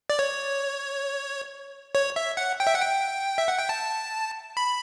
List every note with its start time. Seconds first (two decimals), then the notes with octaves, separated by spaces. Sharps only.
0.10 D5
0.19 C#5
1.95 C#5
2.16 E5
2.37 F#5
2.60 G5
2.67 E5
2.75 F#5
2.82 G5
3.38 E5
3.48 F#5
3.59 G5
3.69 A5
4.57 B5